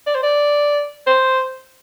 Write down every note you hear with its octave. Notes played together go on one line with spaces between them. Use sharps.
D5
C5
D5
C5